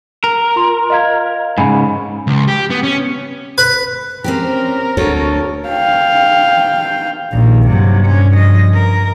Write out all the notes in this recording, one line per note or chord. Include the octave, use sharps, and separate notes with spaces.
A#4
F4 C6
D#5 F5 G#6
G#2 C#3 G#5 B5
C#2
G4
B3
C#4
B4
C4 C#4 G4 A#4
D2 F#4 A4 C#5
F5 G5
A#1 D#2
G2 C3 F#3
C#4
F3 D#5
A#4